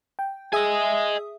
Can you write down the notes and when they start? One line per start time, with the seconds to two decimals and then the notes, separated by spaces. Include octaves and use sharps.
0.19 G5
0.53 G#4 D#5 E5 G#5 D#6